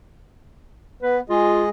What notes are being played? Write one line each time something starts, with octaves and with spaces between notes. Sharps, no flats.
B3 B4
G#3 F4 G#4 D#5